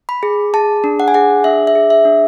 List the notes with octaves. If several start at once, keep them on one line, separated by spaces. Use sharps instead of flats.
B5
G#4
G#4 A5
D4
F#5
G#5
G#4 F#5
D4 E5
E5
G#4
E5
D4